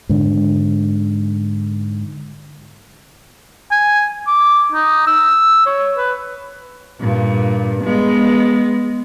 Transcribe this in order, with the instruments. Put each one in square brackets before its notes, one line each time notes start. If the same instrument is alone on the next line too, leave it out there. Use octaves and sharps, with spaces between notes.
[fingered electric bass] G#2 D3
[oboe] G#5
D6
D#4
E6
C#5
B4
[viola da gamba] G2 A#2
G#3 B3